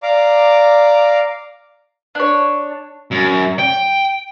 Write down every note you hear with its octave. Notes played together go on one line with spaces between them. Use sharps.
D5 F5 A#5 D6
D4 C#5
F#2
G5